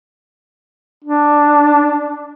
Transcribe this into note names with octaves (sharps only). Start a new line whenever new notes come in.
D4